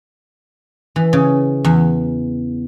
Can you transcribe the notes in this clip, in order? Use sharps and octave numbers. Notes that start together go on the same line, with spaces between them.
E3
C#3
E2